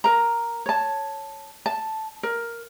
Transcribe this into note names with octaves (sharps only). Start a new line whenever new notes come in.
A#4 A#5
C#5 A5
A5
A#4